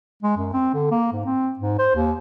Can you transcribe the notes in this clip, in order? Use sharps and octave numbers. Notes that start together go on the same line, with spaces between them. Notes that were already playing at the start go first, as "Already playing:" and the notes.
G#3
F#2
C4
D3
A#3
G#2
C4
G#2
C5
D#2